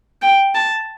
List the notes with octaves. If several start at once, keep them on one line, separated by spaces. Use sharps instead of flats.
G5
A5